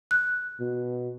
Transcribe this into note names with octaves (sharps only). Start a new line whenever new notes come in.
F#6
B2